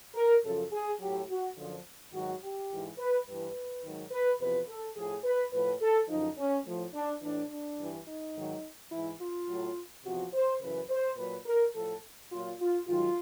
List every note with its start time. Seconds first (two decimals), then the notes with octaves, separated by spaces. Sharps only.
0.15 A#4
0.44 F#2 C#3 F3 A4
0.72 G#4
1.00 A2 F#3 G4
1.29 F#4
1.57 F#2 D3 F3
2.13 G#2 D#3 F#3 F#4
2.42 G4
2.71 G#2 E3
2.98 B4
3.27 G2 E3 B4
3.83 G#2 D#3 F#3
4.11 B4
4.40 E2 C3 F3 B4
4.68 A4
4.96 A2 F3 G#4
5.24 B4
5.53 A2 F3 B4
5.81 A4
6.09 F#2 D3 F3 D#4
6.38 C#4
6.66 A2 F3
6.94 D4
7.22 A2 E3 D4
7.51 D4
7.79 G2 E3
8.07 D#4
8.36 G#2 D#3 F#3
8.91 G#2 E3 E4
9.21 F4
9.48 A2 F#3
10.05 E2 C3 F3 F#4
10.33 C5
10.61 F#2 C#3 E3 B4
10.90 C5
11.17 A#2 F#3 B4
11.46 A#4
11.75 A2 F3 A4
12.31 A#2 F#3 F4
12.60 F4
12.87 G#2 D#3 F#3 F4